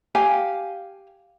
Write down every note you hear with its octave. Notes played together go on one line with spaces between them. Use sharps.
G4 F5 G#5